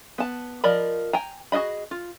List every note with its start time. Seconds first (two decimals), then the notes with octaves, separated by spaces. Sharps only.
0.18 B3 A5
0.64 F3 A#4 D5 D#5 B5
1.13 G5 G#5 A#5
1.52 F#4 G#4 A4 D#5 B5
1.91 F4